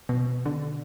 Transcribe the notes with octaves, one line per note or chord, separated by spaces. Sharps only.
B2
D3